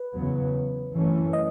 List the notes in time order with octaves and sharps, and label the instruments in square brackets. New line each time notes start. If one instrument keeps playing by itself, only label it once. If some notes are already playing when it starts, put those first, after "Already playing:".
Already playing: [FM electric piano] B4
[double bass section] E2 C#3 F#3 B3
F#2 E3 A3 C#4
[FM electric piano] D#5